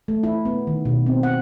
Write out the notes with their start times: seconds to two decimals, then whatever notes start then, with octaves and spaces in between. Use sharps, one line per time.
0.08 A3
0.23 E4
0.45 B3
0.67 D#3
0.85 B2
1.06 C4
1.23 F#5